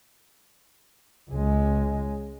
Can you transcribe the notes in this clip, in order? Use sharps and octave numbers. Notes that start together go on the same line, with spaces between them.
C#2 G#3